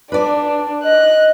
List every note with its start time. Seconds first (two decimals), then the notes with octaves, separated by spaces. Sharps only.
0.12 D4 B4 D5
0.84 D#5 F#6